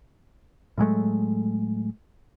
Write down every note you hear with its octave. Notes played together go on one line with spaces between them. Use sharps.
A2 F#3 G#3 A3